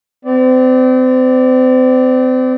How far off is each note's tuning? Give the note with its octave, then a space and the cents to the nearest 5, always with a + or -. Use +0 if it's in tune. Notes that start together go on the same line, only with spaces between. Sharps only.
C4 -35 D5 -5